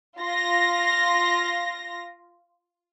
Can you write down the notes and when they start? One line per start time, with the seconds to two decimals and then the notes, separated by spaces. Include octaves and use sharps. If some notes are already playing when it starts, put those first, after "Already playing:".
0.19 F4 A#6